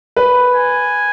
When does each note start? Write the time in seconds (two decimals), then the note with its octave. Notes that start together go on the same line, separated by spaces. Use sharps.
0.16 B4
0.56 G#5